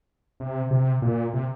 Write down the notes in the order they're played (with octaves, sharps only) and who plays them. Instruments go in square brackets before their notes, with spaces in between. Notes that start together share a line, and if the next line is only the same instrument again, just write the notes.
[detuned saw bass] C3
C3
A#2
C3